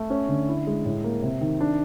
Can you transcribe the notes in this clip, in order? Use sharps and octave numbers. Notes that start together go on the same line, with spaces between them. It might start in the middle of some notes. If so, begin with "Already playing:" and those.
Already playing: A3
C#4
D3
E4
G#3
A2
A#3
C3
D#3
D4